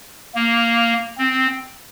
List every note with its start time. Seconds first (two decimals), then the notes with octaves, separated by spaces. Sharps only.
0.35 A#3
1.18 C4